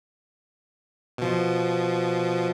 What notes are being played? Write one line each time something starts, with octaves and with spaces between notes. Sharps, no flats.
B2 F3